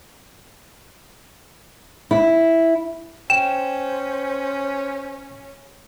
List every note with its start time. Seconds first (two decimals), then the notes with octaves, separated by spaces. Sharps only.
2.11 E4
3.30 C#4 C5 G5 E7